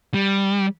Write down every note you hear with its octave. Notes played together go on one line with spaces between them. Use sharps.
G3